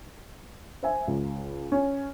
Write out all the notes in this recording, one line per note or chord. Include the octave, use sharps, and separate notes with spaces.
C5 E5 G#5
C#2
C#4